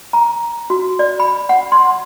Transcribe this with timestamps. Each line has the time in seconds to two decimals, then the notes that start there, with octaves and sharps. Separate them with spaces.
0.13 A#5
0.70 F#4
0.99 D5
1.20 B5
1.49 F#5
1.72 C6